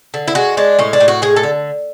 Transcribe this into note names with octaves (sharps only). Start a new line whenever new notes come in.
D3
E4
G#3 F#4
G#3 D4
A2 C#4
D4
A2
F#4
G#3 G#4
A4
D3